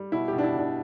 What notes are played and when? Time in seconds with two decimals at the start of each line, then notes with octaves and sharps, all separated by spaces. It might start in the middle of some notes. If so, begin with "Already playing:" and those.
Already playing: G3
0.12 B2 E4
0.28 B2 G4
0.38 D4
0.43 E4
0.54 B2 D4